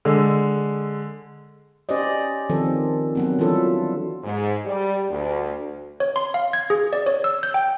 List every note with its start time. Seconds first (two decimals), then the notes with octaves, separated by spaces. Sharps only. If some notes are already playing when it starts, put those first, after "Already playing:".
0.05 D3 G#3
1.89 C#4 G4 C5 D5 D#5
2.49 D#3 F3 C4 A4
3.15 F#3 B3 C4
3.39 E3 G3 D4 F4 A4 B4
4.24 G#2
4.66 G3
5.10 D2
6.00 C#5
6.16 C6
6.34 F5
6.53 G#6
6.70 G#4
6.93 D5
7.06 C#5
7.24 E6
7.43 G6
7.54 G5